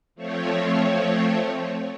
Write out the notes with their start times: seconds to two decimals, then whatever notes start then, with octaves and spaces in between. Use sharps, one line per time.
0.15 F3 A3 C4 C#5